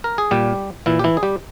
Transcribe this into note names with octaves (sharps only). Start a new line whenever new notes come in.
A#4
G#4
A#2 G3 G4
A#2 E3 E4
G4
E3 E4
G#4
G3 G4